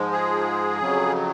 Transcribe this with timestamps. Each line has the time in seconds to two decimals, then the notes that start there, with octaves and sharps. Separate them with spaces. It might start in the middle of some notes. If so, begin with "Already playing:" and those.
Already playing: G#2 F3 G#3
0.12 G#4
0.79 F2 C#3 F#3